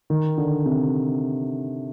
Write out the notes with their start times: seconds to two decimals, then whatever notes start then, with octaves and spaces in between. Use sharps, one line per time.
0.10 D#3
0.38 D3
0.66 C3